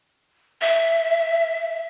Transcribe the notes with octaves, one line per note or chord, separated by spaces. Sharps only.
E5